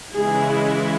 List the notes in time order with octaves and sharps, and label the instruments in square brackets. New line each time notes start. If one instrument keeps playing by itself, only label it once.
[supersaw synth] C#3 E3 G#3 E4 [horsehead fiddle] G#4